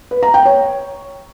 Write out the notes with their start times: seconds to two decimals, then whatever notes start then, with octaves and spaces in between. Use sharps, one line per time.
0.11 B4
0.23 A#5
0.34 G5
0.45 C#5